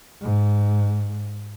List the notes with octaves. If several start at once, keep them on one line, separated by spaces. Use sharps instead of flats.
G#2